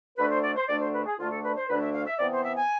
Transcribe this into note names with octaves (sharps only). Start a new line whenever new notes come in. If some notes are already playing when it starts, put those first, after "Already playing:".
D2 D3 A3 D4 B4
C5
D5
C5
D2 D3 A3 D4 D5
C5
B4
G#4
D2 D3 A3 D4 F4
A4
B4
C5
D2 D3 A3 D4 B4
E5
F5
E5
C3 E3 B3 D5
C5
E5
G#5